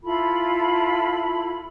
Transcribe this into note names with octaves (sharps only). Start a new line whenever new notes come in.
E4 F4 A4 B5